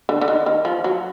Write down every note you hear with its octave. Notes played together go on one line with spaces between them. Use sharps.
D3
D3
D#3
D#3
F3
F#3